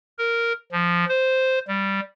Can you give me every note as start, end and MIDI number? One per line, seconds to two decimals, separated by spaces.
0.18 0.53 70
0.72 1.05 53
1.09 1.59 72
1.68 2.00 55